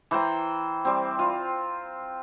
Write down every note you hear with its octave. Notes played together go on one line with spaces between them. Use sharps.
E3 C5 G5 A#5
G3 C4
F4